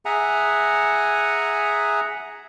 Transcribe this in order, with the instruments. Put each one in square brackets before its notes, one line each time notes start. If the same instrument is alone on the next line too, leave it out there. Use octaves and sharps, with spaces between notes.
[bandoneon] G#4 E5 F#5 G#5 A#5